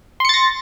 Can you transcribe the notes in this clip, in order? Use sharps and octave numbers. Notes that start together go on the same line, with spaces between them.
C6 A6 A#6 C#7